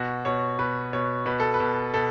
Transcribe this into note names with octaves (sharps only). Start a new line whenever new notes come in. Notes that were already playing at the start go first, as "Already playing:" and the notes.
Already playing: B2 F#4
B2 C#5
B2 B4
B2 C#5
B2 B4
A4
B4
B2
B2 A4